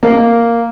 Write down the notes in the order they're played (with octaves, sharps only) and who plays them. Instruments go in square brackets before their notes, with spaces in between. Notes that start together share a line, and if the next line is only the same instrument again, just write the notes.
[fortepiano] A#3